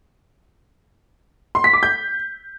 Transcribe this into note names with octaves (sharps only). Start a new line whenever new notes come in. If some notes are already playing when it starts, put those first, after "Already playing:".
C6
B6
D6
G6